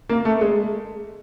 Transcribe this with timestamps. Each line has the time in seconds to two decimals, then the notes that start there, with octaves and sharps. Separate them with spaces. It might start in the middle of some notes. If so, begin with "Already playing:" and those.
0.09 A#3
0.25 A3
0.41 G#3